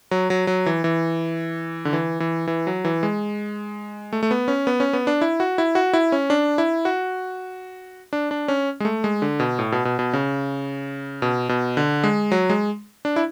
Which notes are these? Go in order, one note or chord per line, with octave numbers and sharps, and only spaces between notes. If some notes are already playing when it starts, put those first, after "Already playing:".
F#3
F#3
F#3
E3
E3
D3
E3
E3
E3
F#3
E3
G#3
A3
A3
B3
C#4
B3
C#4
B3
D4
E4
F#4
E4
F#4
E4
C#4
D4
E4
F#4
D4
D4
C#4
G#3
A3
G#3
D3
B2
A2
B2
B2
B2
C#3
B2
B2
D3
G#3
F#3
G#3
D4
E4